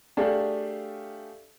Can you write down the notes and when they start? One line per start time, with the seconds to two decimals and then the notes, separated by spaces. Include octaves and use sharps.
0.17 A3 D4 G4 G#4 D5 F5